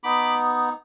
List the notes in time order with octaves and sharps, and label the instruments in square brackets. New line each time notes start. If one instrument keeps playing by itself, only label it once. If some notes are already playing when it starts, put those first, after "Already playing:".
[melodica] B3 D#4 B5 D6